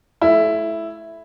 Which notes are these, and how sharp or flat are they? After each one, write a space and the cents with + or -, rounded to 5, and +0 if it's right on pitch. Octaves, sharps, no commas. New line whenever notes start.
A3 -30 E4 +0